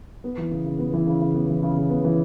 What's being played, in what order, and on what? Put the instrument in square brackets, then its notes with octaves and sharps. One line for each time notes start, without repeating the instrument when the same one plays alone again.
[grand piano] B3
E3
C#3
C#3
B3
E3
C#3
C#3
B3
E3
C#3
C#3
B3
E3